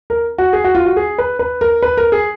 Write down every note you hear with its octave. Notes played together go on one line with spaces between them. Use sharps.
A#4
F#4
G#4
F#4
F4
F#4
G#4
B4
B4
A#4
B4
A#4
G#4